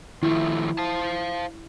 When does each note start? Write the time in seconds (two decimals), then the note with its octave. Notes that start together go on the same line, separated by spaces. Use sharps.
0.23 D#3 F3 A3 E4
0.79 C5 F5 A5